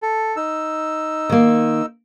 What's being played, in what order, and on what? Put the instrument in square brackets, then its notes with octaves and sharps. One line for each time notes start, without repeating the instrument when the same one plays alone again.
[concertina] A4
D#4 E6
[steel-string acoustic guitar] D#3 A#3